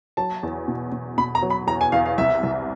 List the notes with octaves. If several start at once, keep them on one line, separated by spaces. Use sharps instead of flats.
F#3 A5
E2
B2
B2
B2 B5
A#5
F#3
B5
E2 A#5
G#5
E2 F5
F5
C2 E5
C2